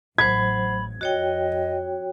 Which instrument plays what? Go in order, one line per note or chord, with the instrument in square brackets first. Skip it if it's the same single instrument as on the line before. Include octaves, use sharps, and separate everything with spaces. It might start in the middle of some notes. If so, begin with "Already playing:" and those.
[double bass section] A1 [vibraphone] F#3 C5 [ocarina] B5 [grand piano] G#6
[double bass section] F2 [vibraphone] F#4 C#5 G5 [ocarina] D#5